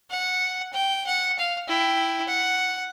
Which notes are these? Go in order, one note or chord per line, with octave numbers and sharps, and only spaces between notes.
F#5
G5
F#5
F5
E4 G5
F#5